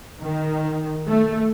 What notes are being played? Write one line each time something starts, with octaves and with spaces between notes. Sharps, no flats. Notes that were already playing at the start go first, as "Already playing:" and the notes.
D#3
A3